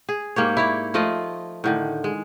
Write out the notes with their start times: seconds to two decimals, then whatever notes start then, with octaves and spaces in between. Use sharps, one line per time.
0.09 G#4
0.36 G#2 A#3 G4 C#5
0.57 E4 C#5 D5
0.94 F3 A3 F4 D#5
1.64 A2 D3 D#3
2.04 G#3